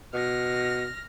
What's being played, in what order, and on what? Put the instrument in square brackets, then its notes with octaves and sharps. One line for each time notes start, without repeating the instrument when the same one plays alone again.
[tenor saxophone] B2 [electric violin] F6 A#6